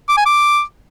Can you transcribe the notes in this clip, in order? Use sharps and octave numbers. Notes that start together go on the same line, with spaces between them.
D6
G#5
D6